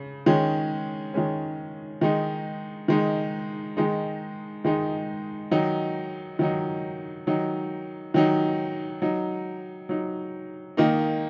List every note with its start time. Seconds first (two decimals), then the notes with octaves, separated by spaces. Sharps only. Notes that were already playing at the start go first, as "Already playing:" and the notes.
Already playing: C#3
0.26 D#3 G#3 C#4
1.14 D#3 G#3 C#4
2.01 D#3 G#3 D#4
2.88 D#3 G#3 D#4
3.77 D#3 G#3 D#4
4.65 D#3 G#3 D#4
5.51 D#3 F#3 D#4
6.39 D#3 F#3 D#4
7.27 D#3 F#3 D#4
8.14 D#3 F#3 D#4
9.02 F#3 D#4
9.89 F#3 D#4
10.77 D#3 A#3 D#4